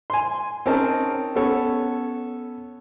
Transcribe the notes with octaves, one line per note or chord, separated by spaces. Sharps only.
G#5 C6
C4 C#4 D#4 G#4 A#4 A5
B3 C#4 A4 C#5